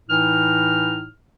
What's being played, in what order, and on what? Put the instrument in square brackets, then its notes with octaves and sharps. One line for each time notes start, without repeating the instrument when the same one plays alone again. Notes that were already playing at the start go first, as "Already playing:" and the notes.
[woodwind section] A2 E3 D#4 F6